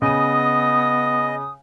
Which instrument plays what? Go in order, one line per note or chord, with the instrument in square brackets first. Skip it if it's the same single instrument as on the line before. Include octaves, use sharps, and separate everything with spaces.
[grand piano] C#3 D#7 [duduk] B3 [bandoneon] D#5 [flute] D#6